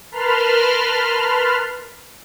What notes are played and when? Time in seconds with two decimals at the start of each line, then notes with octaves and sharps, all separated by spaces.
0.12 A#4 B4 A5 B5 C6 F6